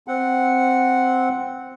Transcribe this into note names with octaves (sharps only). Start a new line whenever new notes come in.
C4 F#5